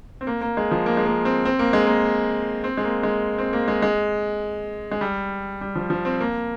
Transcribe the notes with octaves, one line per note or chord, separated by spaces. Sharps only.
C4
A#3
A#3
G#3
F3
A#3
G#3
A#3
C4
C4
A#3
G#3
A#3
C4
G#3
A#3
G#3
C4
A#3
G#3
G#3
G#3
G3
G3
F3
F3
C4
A#3